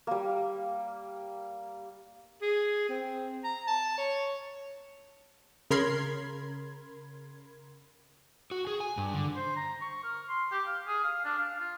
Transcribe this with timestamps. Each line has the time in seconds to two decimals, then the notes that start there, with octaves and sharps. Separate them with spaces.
0.07 G3 A#3
2.42 G#4
2.89 C4
3.44 A#5
3.67 A5
3.98 C#5
5.70 C#3 A#4 B5 C6 G#6
8.51 F#4
8.67 G#4
8.80 G#5
8.97 G2
9.14 D3
9.36 C5
9.56 A#5
9.81 C#6
10.04 A#4
10.29 C6
10.51 G4
10.67 F5
10.87 G#4
11.04 F5
11.25 D4
11.38 F5
11.60 F4